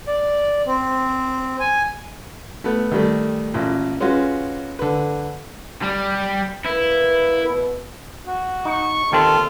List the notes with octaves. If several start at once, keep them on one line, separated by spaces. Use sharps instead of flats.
D5
C4
G#5
A3 B3
D#3 G3 A3
A1 A#2
G#3 C#4 F4 F#4 B4
D3 B4
G3
A#3 E4 A#4 B4
B2 B3
F#4
D#4 C#6
D#2 D#3 C4 F4 A4